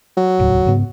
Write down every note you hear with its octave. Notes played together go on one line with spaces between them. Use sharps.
F#3
D#1 C#2 A2
G#2 C#3 B3